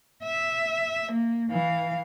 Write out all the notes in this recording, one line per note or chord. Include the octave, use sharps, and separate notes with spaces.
E5
A#3
E3 F5